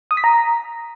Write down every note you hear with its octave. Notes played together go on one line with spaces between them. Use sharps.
D#6
B6
A#5